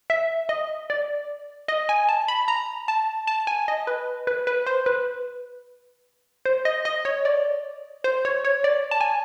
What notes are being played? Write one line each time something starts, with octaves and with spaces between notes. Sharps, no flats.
E5
D#5
D5
D#5
G#5
A5
B5
A#5
A5
A5
G#5
D#5
B4
B4
B4
C5
B4
C5
D#5
D#5
C#5
D5
C5
C#5
C#5
D5
A5
G#5